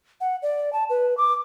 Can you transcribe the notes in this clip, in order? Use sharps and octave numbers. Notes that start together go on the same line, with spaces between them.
F#5
D5
A5
B4
D6